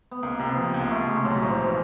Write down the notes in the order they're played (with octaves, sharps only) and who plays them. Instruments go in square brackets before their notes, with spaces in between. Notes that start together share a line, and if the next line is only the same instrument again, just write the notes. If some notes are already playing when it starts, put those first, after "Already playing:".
[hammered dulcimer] B3
[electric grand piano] C#2 [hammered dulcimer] A#3
[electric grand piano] C3
[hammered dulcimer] B3
[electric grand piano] F3
[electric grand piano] C#2 [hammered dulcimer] A#3
[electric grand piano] C#2 [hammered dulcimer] A3
[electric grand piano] C3 [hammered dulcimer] G#3
[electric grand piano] B1 [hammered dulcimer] F#3
[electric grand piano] A2
[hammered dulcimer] F3
[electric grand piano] E3